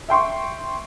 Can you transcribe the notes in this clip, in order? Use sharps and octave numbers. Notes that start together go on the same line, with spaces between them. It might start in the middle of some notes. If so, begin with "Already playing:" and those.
E5 G5 C6 C#6